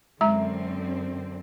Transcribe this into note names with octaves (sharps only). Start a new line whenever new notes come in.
F#2 D3 G#3 C4 E5 A#5